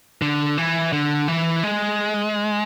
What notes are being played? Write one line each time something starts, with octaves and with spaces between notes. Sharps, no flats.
D3
E3
D3
E3
G#3